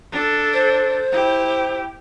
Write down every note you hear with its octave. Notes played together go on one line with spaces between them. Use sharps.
D4 A4
C5
E4 G4